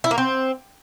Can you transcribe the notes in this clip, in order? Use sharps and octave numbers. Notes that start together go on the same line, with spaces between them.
E4
A#3
C4